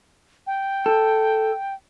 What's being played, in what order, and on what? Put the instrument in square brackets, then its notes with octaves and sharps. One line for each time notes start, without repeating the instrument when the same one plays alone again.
[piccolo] G5
[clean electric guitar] A4